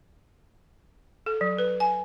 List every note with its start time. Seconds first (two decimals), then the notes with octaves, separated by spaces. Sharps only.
1.26 A4
1.41 F#3
1.59 B4
1.80 G#5